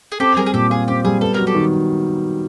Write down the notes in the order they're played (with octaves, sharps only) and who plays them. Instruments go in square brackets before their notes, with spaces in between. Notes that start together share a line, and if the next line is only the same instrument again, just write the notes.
[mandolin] G#4
[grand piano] C4 [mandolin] G4 A4
[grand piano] G3 [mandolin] G#4 A#4
[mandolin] G#4
[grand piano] A#2 [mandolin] G4 A4
[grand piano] F4 [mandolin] G#4
[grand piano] C4 [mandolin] G4
[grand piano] G3 [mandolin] G#4
[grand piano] B3 [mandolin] A4
[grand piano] F#3 [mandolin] A#4
[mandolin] G4 A4
[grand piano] D#3